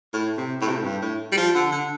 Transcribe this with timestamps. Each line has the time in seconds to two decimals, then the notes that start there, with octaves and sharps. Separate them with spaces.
0.14 A2
0.37 C3
0.61 A2
0.68 C3
0.77 A2
0.84 G2
1.02 A2
1.32 G3
1.37 F3
1.55 D3
1.72 D3